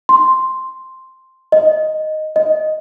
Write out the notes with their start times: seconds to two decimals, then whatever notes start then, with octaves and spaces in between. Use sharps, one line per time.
0.09 C6
1.52 D#5
2.36 D#5